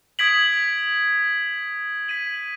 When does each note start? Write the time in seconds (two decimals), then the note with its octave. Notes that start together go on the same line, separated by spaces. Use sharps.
0.19 D#6 G#6 B6 D7 F#7
2.08 G#6 B6 D#7 F#7